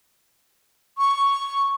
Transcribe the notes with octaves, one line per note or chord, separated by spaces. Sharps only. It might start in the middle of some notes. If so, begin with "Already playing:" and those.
C#6